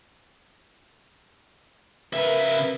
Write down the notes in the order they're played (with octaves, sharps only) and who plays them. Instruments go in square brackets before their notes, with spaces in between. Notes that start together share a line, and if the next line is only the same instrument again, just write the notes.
[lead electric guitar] C#3 E5 [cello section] A#4 B4